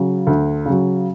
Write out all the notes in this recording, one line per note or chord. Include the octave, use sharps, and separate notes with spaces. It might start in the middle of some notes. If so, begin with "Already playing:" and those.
Already playing: C#3 F#3
D2
C#3 F#3